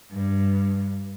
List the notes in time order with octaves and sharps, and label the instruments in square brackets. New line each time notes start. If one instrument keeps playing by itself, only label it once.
[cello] G2